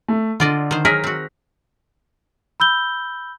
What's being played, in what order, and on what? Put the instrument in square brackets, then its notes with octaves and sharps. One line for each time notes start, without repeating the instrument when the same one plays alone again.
[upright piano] A3
[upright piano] D3 [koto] F4 D5 D#5
[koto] D#3 C5
[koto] F#3 G#4 A#4 [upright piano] F6 A#6 B6
[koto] C4 F#4
[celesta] B5 E6 G6 G7